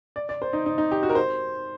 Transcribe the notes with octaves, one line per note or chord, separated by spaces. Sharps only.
D5
D5
C5
D#4
D#4
D#4
G4
F#4
A#4
C5